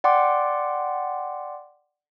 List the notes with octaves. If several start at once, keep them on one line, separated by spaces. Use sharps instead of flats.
D5 F#5 G5 C6 D6